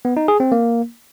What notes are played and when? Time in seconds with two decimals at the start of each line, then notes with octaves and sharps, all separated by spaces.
0.05 B3
0.17 D#4
0.28 G#4
0.40 C4
0.52 A#3